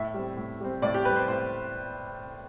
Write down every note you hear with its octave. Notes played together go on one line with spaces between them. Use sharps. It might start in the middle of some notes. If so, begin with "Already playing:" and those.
Already playing: A2 E5
G3 C4
A2
G3 C4
A2 D5
G4
G3 C4 B4
C5
A2 C5